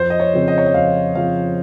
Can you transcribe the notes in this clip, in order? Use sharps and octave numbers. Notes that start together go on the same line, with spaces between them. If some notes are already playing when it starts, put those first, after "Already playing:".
Already playing: F2 C5
D#5
C#5
C#3 F3 C4
D#5
C#5
D#5
F2 F5
C#3 F3 C4 F5